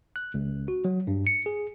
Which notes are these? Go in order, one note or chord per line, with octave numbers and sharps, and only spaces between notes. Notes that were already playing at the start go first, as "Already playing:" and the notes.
F#6
C#2
F#4
F#3
G2
C#7
G#4